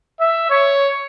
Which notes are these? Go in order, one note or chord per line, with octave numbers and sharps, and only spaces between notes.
E5
C#5